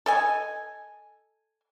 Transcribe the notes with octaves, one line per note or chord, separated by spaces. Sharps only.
A4 D#5 G#5